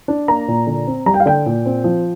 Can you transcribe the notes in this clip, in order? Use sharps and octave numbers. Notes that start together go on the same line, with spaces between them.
D4
A#3 A#5
A#2
D3
C4
G3 A#5
G5
F5
D3 G5
A#2
C4
F3